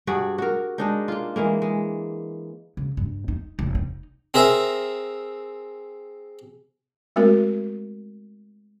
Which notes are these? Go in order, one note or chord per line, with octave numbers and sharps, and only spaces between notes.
G2 F#4 G#4 D5
F#4 A#4
G#3 D4 D#4
A#3 F4
E3 G#3 A#3
G#3
C#3
G2
D#4
F1
D#4
C4 G#4 A#4 E5
G#3 A3 C4 F#4 A#4